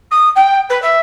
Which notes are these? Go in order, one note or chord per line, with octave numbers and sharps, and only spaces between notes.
D#6
G5
B4
E5